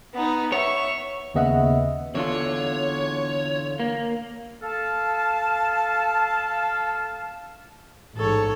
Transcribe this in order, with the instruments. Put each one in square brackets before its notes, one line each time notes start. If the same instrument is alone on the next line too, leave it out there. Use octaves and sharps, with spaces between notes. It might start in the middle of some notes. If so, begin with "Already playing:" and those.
[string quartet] B3 D#4
[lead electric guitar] C#5 [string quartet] E5 C#6
[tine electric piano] D#2 C#3 B3 D#5 E5 F#5
[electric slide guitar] E2 D3 F4 [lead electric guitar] C#5
[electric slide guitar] A#3
[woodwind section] A4 F5 A5
[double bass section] A1 G#2 [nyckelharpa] A4 C#5